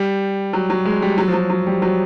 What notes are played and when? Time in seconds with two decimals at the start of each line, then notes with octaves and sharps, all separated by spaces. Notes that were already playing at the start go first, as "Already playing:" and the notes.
Already playing: G3
0.53 F#3
0.70 F#3
0.85 G#3
1.02 G3
1.18 F#3
1.28 F3
1.34 F#3
1.50 F#3
1.67 G3
1.82 F#3